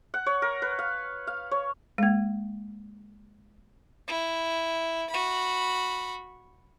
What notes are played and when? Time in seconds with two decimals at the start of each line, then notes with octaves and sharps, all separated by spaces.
0.14 F#5
0.26 C#5
0.42 A#4
0.62 B4
0.79 F5
1.27 F5
1.51 C#5
1.98 G#3 A#3
4.08 E4
5.10 F#4 B5